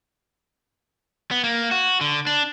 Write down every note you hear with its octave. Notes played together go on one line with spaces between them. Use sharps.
B3
A#3
F#4
D3
D4